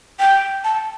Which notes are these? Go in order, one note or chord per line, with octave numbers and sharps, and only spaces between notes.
G5
A5